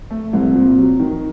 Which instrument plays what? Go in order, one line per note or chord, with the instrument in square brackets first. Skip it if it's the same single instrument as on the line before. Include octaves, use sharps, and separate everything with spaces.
[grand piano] A3
[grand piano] C2 [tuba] C4
[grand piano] A#2
F#3
D#3